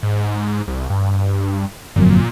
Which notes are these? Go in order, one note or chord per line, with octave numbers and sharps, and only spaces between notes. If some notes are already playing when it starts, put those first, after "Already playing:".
G#2
C2
G2
G1 F2 A#2 F#3